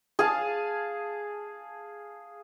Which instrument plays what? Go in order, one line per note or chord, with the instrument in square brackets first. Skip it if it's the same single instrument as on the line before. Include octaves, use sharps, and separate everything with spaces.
[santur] G#4 F5 A5